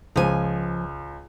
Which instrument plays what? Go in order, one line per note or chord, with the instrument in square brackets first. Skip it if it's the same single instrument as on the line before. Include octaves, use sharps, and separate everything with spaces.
[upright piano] C#2 [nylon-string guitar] F3 G#5